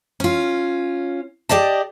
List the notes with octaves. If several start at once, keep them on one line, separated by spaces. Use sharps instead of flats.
C#4 F4
G4 D5 D#5 A5